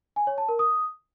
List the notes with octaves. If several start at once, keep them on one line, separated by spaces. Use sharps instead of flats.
G#5
C#5
A5
A#4
D#6